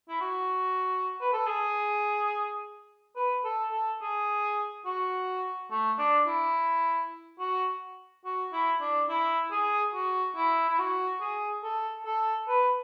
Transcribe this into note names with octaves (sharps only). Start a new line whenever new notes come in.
E4
F#4
B4
A4
G#4
B4
A4
A4
G#4
F#4
A3
D4
E4
F#4
F#4
E4
D4
E4
G#4
F#4
E4
E4
F#4
G#4
A4
A4
B4